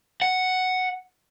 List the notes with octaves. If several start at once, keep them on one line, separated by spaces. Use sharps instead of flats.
F#5